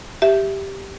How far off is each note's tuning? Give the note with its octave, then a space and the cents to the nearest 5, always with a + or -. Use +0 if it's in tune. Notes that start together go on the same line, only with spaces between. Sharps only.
G4 +0 E5 +5